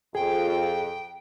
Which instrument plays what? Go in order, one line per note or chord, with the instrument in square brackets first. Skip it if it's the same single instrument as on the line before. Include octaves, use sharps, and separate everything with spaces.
[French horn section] F2 [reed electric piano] G#4 [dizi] G5